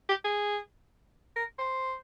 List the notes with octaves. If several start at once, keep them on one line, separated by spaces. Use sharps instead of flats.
G4
G#4
A#4
C5